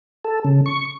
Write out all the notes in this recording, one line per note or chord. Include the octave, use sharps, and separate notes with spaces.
A4
C#3
C#6